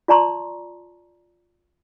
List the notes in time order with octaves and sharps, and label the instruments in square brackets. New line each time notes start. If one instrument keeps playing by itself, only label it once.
[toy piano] F4 D5 A5 A#5 C6 C#6